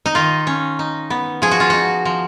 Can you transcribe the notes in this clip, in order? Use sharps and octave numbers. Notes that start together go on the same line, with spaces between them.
D#4
D#3 F4
C#4
D#4
B3
F3 G#4
F#4
F4
D#4 F#4
F3